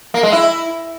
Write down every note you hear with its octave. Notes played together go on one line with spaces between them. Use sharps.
A#3
G#3
E4